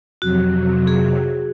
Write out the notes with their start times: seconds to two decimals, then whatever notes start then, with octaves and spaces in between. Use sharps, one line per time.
0.22 F2 C3 F#3 F#4
0.87 G#4